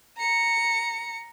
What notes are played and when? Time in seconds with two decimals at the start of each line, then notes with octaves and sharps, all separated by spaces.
0.18 A#5 C#7